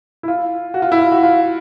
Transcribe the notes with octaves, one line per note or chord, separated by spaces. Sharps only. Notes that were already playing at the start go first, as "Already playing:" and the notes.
E4
F4
F#4
F4
E4
F4
F#4
F4